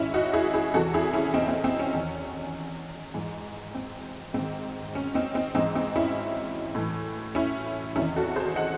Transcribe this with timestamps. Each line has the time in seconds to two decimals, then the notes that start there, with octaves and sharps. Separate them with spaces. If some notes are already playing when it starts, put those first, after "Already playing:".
Already playing: G#2 D#3 C#4 E4
0.14 D#4 F#4
0.33 E4 G#4
0.54 E4 G#4
0.74 E2 C3 E3 F#4 A4
0.94 E4 G#4
1.14 C#4 E4
1.34 C4 D#4
1.48 C4
1.64 C4
1.79 C#4
1.93 E2 D#3
3.14 G#2 E3
3.75 C4
4.34 G#2 C4
4.39 D#3
4.95 C#4
5.14 C4 D#4
5.34 C4 D#4
5.55 G#2 E3 C4 D#4
5.75 C4 D#4
5.96 C#4 E4
6.75 A2 E3
7.35 C#4 E4
7.96 E2 C3 D#3 C#4 E4
8.16 F#4 A4
8.36 G#4 C5
8.56 D#5 F#5